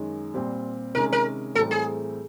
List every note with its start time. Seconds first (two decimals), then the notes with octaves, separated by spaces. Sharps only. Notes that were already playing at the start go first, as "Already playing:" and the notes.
Already playing: F#2 D#3 G#3
0.34 A#2 G3 C4
0.94 C3 D#3 G#3 C#4 A#4
1.12 A#4
1.55 A2 E3 G3 C4 A4
1.71 G#4